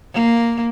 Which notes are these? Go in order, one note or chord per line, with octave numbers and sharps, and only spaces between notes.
A#3